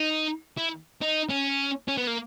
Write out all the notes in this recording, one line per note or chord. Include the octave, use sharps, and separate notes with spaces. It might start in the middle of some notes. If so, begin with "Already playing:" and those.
Already playing: D#4
E4
D#4
C#4
C#4
B3
A#3